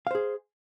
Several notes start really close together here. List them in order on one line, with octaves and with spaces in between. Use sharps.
F5 C5 G#4